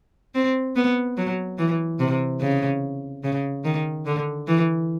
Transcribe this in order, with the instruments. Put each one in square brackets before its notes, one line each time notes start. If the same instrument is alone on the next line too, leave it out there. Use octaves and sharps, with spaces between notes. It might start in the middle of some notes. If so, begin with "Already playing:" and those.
[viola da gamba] C4
B3
F#3
E3
C3
C#3
C#3
D#3
D3
E3